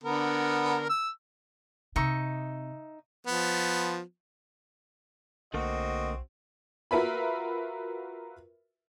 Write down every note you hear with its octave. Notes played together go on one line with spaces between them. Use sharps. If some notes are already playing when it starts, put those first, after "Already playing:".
D3 B3 A#4
E6
C3 D#4 E5 C#6
F3 B3
B1 D3 A3 A#3 C4 F#4 D#5
F4 F#4 A#4 B4 E5 B5